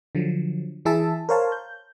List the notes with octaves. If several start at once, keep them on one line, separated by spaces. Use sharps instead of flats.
D3 F3 F#3
E3 E4 G#4 E5 A5
A#4 C5 C#5 F5 A5
G6